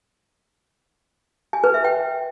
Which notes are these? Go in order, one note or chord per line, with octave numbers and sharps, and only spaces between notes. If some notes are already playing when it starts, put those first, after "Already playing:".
G#5
B4
E5
G5